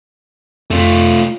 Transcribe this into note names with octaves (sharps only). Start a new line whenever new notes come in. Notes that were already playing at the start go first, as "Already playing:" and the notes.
F2 A3 F4